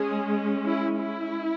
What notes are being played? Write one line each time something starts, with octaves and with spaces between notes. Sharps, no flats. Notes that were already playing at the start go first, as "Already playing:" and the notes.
Already playing: G#3 C#4 G#4
E4
E4